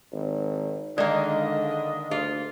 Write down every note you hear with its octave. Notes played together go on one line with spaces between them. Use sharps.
G#1
D3 D#3 G#3 A#3 D5 D#5
D2 F4 G#4